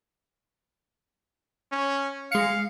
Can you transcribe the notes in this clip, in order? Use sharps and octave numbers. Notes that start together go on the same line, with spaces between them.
C#4
G#3 F5 C#7